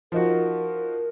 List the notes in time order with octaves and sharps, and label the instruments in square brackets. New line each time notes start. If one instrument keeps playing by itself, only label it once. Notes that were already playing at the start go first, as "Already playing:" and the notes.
[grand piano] F3 D#4 F#4 [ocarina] A#4